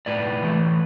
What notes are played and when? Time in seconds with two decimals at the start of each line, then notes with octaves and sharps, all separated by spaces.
0.06 A2 B4 D5
0.42 E3 A3